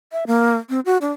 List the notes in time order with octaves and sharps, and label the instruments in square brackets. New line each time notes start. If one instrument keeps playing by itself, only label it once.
[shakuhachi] E5
A#3
C4
F#4
D4